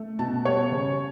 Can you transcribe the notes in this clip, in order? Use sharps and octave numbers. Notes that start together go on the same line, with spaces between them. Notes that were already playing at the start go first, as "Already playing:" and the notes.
Already playing: A3
B2 A5
G3 C#5
C#3